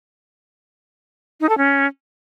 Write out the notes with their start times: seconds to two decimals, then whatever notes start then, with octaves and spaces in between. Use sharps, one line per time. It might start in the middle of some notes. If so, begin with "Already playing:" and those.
1.40 D#4
1.49 A4
1.58 C#4